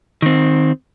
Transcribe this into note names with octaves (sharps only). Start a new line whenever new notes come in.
D#3 C4